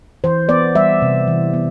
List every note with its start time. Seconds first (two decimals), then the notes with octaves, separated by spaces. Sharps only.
0.24 E3 C5
0.49 B3 D5
0.75 G3 E5
1.02 C3
1.28 E3
1.54 B3